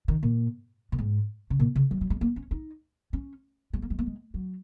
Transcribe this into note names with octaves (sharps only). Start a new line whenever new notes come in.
D#3
A#2
A#2
G#2
C#3
A#2
C#3
F#3
F#3
G#3
A#3
C#4
D#4
C#4
G#3
A#3
G#3
A#3
G#3
F#3